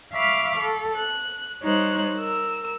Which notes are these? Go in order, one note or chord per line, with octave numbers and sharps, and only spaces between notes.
E5 F5 B5 C#6 D6 F6
A4
F#6
G3 D#4 C5 C#5 F#6
A#4 E6